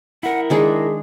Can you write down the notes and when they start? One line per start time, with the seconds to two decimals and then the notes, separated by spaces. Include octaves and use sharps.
0.23 E4 A#4 F#5
0.50 D#3 G#3 D4 G#4